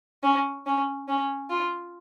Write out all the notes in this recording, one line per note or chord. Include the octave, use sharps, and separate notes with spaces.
C#4
C#4
C#4
F4